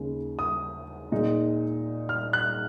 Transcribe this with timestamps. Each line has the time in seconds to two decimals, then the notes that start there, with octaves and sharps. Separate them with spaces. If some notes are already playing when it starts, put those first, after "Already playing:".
Already playing: D#2 C#3 G#3
0.39 D#6
1.12 A#2 G#3 D#4
2.09 F6
2.33 F#6